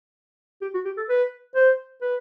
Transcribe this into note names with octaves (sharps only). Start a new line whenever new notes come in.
G4
F#4
G4
A4
B4
C5
B4